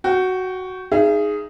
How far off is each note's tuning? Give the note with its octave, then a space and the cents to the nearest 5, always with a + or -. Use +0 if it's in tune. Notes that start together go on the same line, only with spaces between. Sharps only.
F#4 +5 G5 -20
D#4 +0 G#4 +0 E5 +45